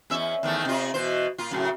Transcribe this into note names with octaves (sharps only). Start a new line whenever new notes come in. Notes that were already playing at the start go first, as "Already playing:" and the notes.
E2 C#4 E5
E2 D#3 A3
C3 F4
B2 E3 C5
A#2 F4
F#2 A2 C#3